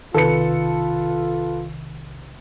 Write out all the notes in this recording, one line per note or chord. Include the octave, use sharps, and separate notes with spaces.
B1 C3 D#3 F4 A4 B4 C#7